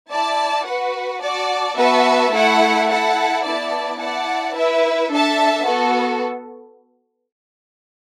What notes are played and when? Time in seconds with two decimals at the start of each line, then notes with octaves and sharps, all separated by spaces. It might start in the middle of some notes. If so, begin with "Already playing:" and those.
0.11 E4 D5 A5
0.66 F#4 B4 F#5
1.22 F#4 D5 A5
1.77 B3 F#4 B4 E5 A5
2.33 A3 E4 A4 F#5
2.89 E4 A4 F#5 A5
3.44 B3 E4 D5 A5
4.00 E4 D5 F#5 A5
4.56 E4 B4 E5
5.11 D4 A4 E5 A5
5.66 B3 F#4 A4